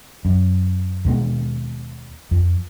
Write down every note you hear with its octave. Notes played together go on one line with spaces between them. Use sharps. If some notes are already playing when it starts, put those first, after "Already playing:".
F#2
D#2 B2 G#3 B3
F2